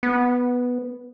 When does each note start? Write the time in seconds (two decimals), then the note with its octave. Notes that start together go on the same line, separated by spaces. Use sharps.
0.03 B3